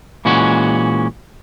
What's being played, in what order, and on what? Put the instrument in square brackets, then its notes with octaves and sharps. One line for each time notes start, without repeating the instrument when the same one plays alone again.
[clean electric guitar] A#2 E3 G#3 C#4 F#4